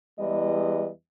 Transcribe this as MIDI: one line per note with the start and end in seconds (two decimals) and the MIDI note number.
0.19 0.88 40
0.19 0.88 52
0.19 0.88 55
0.19 0.88 56
0.19 0.88 75